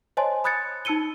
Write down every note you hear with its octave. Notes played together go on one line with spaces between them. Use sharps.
C5 C#5 D#5 G#5 A5 C6
B5 D#6 F#6 G#6 A6 C#7
D#4 A5 E6 C#7 D#7 G7